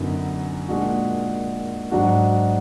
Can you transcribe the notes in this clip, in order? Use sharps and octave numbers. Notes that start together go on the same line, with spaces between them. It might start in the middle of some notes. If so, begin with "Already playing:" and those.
Already playing: F#2 D3 F#3 B3 D#4
A#2 G#3 D4 F#4
G#2 F#3 D4 F#4